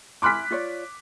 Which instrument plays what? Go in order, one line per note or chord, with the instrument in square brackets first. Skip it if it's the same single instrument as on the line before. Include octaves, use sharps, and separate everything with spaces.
[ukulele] E4 G#5 [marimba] B5 C6 F6 [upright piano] D6 F#6 B6
[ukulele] F4 C#5 D5